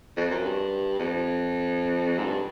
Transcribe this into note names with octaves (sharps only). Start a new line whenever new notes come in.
F2
F#2
G2
F2
G#2
G2